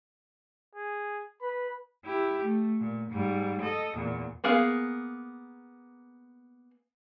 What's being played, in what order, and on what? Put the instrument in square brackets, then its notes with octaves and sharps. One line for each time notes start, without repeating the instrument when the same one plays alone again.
[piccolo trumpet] G#4
[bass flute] B4 [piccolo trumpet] B5
[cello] E4 G4
A3
A#2
G#2 G3
A4 D#5
E2 A#2
[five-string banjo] A#3 B3 G#4 A#4 F5